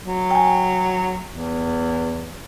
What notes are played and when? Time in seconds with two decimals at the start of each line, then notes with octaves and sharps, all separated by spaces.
0.04 F#3
0.31 G5 G#5
1.29 E2